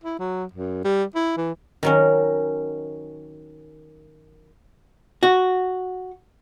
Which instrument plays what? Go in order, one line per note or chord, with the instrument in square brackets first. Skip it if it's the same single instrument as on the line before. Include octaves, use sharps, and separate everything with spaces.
[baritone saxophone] E4
F#3
F#2
G3
E4
E3
[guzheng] D#3 F#3 C#4
[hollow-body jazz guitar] F#4